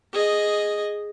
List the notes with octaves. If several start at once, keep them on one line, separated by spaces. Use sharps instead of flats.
G#4 D#5